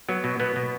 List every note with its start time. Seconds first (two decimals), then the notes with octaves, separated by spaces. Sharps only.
0.08 F#3 B3
0.24 B2
0.40 B2 B3
0.56 B2